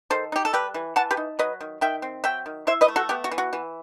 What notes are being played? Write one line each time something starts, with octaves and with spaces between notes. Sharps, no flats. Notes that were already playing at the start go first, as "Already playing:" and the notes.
D#3 A4 C5
D#4 G4
A4
G3 G4 B4
E3
E3 F#5 A5
G4 B4
D#4
F#3 B4 D#5
D#3
D#3 E5 G5
C4
F#3 E5 G5
D#3
E4 C5 E5
B4 D#5
A3
F#4 A4
B3 G4
F#4
E3
F#4
E3